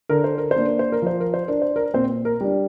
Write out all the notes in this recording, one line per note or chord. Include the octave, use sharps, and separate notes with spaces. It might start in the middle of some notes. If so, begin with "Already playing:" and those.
D3 A#4
C5
A#4
C5
A#3 D4
A#4
C5
A#4
F3 C5
A#4
C5
D4 A#4
C5
A#4
A#2 C4 C5
A#4
G3 D4